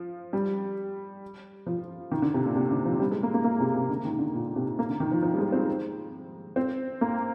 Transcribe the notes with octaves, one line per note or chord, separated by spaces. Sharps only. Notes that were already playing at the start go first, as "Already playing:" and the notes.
Already playing: F3
G3
F3
D#3
D3
C3
A#2
C3
D3
F3
G3
G#3
A#3
A#3
A#3
C3
C3
D3
D#3
D3
A#2
C3
A#3
D3
D#3
F3
F3
G3
G#3
C4
C4
A#3